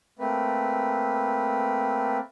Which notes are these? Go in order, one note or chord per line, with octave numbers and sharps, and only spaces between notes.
A3 A#3 C4 B4